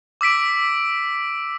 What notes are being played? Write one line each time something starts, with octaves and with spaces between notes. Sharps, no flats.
D6 E6 B6 D7